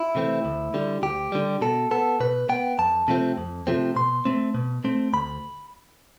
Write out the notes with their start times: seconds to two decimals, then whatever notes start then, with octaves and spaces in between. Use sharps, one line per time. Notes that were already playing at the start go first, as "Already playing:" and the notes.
Already playing: E4
0.15 C3 E3 A3 C4
0.45 D2
0.74 D3 G3
1.03 D2 G4
1.32 D3 G3
1.61 B2 A4
1.91 B3 A4
2.20 B2 B4
2.49 B3 G5
2.79 F2 A5
3.08 C3 F3 A3 C4
3.37 F2
3.67 C3 F3 A3 C4
3.96 B2 C6
4.25 A3 C4
4.54 B2
4.84 A3 C4
5.13 D2 B5